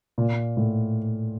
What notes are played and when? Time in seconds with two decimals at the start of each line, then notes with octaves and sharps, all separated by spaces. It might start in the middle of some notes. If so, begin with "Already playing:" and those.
0.18 A#2
0.57 A2